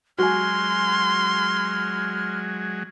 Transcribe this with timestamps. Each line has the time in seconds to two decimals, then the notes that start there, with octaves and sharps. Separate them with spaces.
0.18 F#3 G#3 F#4 G#5 C6 F6